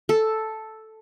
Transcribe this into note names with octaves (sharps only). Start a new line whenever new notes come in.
A4